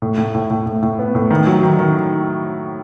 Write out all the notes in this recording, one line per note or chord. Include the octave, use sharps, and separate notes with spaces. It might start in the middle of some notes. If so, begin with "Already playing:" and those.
A2
A2
A2
A2
A2
A2
B3
A2
D#3
F#3
D#3
D#3